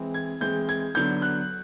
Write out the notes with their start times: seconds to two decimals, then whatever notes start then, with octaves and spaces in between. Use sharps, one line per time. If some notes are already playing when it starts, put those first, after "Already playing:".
Already playing: E3 G#3 C4
0.14 G#6
0.40 E3 G#3 C4 G6
0.69 G#6
0.95 D3 F#3 B3 G6
1.22 F#6